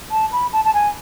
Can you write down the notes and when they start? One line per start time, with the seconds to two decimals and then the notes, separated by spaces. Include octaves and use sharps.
0.11 A5
0.32 B5
0.53 A5
0.65 A5
0.74 G#5